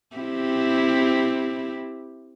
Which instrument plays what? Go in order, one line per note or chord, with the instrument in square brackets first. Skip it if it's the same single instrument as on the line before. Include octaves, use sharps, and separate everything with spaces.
[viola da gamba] C4 E4 G4